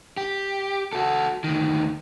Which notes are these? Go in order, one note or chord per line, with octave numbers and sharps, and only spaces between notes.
G4
F#4 A4
D2 D#3